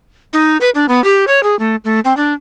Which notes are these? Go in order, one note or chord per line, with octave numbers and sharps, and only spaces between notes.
D#4
B4
D4
B3
G4
C#5
G#4
A3
A3
C4
D4